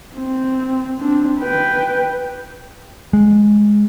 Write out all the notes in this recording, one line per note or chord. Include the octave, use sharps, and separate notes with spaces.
C4
C4 D4
B4 G5
G#3